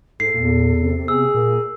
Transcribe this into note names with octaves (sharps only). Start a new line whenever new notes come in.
G#2 A4 C7
E2 A#2
A#2
C3
B3 G#4 E6
A#2 A#4